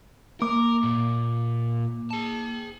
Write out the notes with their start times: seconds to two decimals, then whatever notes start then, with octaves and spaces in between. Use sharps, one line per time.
0.42 A#3 A#4 D6
0.84 A#2
2.11 G#4 A5